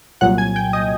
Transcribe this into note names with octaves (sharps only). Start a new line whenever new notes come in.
C2 A#2 F#3 F#5 F#6
G#5 G#6
G5 G6
D#5 D#6